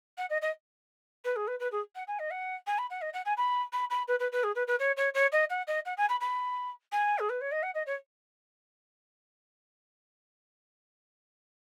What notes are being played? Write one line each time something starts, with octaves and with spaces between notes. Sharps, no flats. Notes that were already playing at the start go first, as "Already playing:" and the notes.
F#5
D#5
D#5
B4
G#4
B4
B4
G#4
F#5
G#5
D#5
F#5
G#5
B5
F#5
D#5
F#5
G#5
B5
B5
B5
B4
B4
B4
G#4
B4
B4
C#5
C#5
C#5
D#5
F#5
D#5
F#5
G#5
B5
B5
G#5
G#4
B4
C#5
D#5
F#5
D#5
C#5